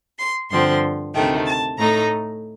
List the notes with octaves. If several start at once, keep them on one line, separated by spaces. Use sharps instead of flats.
C6
G2 D3 F3 C4 C6
D2 C3 D#3 A3 G5
A5
A2 A3 D#4 A#5